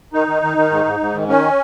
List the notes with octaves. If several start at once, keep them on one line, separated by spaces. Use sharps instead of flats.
D#3 D#4
D#3
D#3
D#3
G#2
G#2
G#2
D#3
D#3 C#4